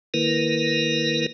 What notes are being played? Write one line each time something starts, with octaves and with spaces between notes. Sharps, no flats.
D#3 A#3 E4 A#4 B4